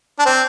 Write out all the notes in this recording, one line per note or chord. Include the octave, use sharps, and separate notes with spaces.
D4
C4